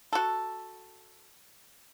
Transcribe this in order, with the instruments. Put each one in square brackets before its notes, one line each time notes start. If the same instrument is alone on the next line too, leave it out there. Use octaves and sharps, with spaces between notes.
[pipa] F#4 A4